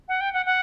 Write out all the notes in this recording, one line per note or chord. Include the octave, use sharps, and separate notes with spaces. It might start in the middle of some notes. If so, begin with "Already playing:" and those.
F#5
G5
F#5
F#5